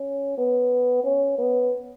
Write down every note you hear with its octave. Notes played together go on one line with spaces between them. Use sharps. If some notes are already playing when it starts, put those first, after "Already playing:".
Already playing: C#4
B3
C#4
B3